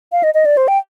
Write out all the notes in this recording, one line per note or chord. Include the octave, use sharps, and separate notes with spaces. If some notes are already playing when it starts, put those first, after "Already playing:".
F5
D#5
D#5
D5
C5
G5